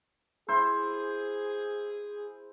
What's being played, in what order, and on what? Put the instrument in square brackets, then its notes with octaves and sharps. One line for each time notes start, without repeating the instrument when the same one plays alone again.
[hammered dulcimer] E4 C5 [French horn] G#4